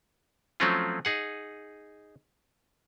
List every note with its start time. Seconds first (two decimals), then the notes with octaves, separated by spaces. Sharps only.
0.60 F3 F#3 A3 C4 C#4 F4
1.05 D#4 G#4 F#5